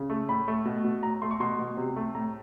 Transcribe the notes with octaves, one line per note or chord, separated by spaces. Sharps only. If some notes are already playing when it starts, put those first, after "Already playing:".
Already playing: C#3
A3
A2 B5
A3
B2
B2
A2 A#5
A3 C6
C#6
B2 C6
B2
C3
A3
A2 A#5